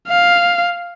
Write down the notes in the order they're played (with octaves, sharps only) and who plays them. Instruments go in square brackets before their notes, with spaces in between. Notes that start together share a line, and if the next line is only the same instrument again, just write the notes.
[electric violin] F5